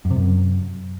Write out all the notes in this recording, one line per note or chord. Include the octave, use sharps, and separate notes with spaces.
F#2
C3
F#2